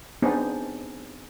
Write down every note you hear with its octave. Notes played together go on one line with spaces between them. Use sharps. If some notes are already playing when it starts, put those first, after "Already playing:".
B3 C4 D4 D#4 G#4